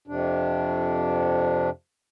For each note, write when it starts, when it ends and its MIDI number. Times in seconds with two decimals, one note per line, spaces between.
0.07 1.70 41
0.07 1.70 48
0.07 1.70 62